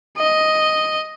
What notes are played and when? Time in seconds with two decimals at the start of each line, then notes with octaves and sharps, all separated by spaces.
0.18 D#5